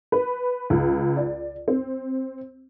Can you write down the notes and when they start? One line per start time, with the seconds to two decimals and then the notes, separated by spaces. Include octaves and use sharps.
0.12 B4
0.70 C#2
1.17 D5
1.68 C4